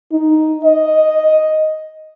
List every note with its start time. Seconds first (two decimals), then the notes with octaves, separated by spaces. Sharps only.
0.12 D#4
0.64 D#5